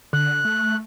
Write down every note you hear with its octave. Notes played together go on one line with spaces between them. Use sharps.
D3 F#6
A3